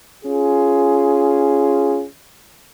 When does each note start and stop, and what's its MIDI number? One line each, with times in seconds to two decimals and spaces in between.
0.25 2.05 61
0.25 2.05 65
0.25 2.05 68